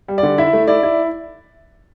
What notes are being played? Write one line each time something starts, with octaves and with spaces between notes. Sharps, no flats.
G3
D5
D3
E4 E5
A3
E4 D5
E4